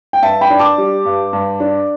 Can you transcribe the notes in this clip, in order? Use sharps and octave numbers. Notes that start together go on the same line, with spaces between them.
G5
G2 E5 A5
G5 B5
D4
A5 D6
G3
G2
G2
D4